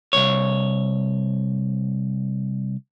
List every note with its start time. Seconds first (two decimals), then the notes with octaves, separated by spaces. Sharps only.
0.13 C2 F2 C#5